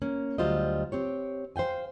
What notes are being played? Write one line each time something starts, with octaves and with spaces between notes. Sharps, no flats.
A#3 C#4
D2 F#3 G3 F4 C5 D#5
C4 G4 C#5
C5 F5 G5 G#5